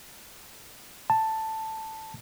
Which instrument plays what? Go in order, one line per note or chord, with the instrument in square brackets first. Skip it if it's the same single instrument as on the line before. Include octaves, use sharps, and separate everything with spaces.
[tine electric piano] A5